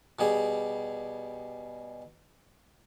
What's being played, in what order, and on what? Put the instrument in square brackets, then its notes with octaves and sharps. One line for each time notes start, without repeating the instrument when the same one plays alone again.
[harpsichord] B2 G3 G#4